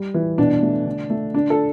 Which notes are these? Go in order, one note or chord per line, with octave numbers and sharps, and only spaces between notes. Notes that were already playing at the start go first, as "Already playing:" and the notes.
Already playing: G3
E3
B2 D4
A3
D3
A3
D3 D4
A4